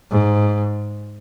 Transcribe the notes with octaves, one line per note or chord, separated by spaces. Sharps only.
G#2